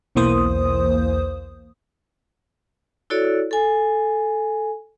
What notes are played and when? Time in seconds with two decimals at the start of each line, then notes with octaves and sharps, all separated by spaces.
0.15 B1 E2 E3 A#3 C5 D#6
3.10 E4 F#4 A4 C#5 D5
3.51 A4 G#5